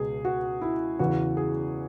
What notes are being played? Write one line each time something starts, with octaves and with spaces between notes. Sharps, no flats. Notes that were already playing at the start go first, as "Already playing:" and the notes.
Already playing: C#2 B2 G#4
F#4
E4
E2 C#3 E3 F#4
G#4